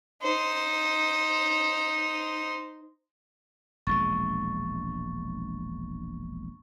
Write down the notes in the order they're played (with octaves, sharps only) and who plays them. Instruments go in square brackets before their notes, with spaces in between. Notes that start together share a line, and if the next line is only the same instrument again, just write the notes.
[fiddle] D#4 C5
[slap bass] E1 A#1 G#3 [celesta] C#6 A6